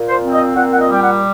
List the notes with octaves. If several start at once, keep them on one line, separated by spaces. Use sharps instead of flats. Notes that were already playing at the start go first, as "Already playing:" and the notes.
Already playing: A#2
C5
C4
D#5
A#2 F#5
F#5
D#5
G3 G5
F#5